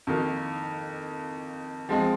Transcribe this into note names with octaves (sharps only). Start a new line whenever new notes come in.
F2 D#3 A#3
F3 G#3 C4